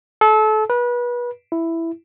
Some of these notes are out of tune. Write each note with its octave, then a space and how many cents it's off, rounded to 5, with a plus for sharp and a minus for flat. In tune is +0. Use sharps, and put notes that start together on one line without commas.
A4 -30
B4 -30
E4 +5